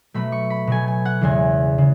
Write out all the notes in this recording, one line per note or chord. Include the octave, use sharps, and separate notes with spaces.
B2 F#3 A3 B5
C#6
B5
B2 F#3 A3 G#5
G#5
F#5
E2 C#3 E3 G#3 G#5
C#3